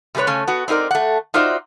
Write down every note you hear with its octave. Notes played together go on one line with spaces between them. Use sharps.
C3 G3 G4 B4 C#5
C#3 A3 C#4
B3 F#4
C4 D#4 F4 A#4 D5
A3 F#5
D#4 F4 F#4 C5 D5 E5